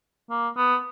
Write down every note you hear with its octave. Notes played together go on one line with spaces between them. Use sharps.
A#3
B3